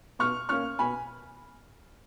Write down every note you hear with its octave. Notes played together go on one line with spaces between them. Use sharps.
B2 C#6 F6
A#3 C#4 C#6 F6
B2 G#5 B5